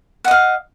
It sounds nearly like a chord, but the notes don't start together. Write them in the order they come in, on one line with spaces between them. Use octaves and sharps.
F#5 D#5 F5